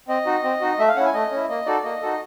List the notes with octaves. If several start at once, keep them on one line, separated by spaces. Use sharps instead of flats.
C4 D#5
D#4 F#4
C4
D#4 F#4
A3 E5
F5
C#4 E4 F#5
G#5
A3 D#5
C#4 E4
A#3 D#5
D#4 F#4 A4 D5
A#3 D#5
D#4 F#4 A4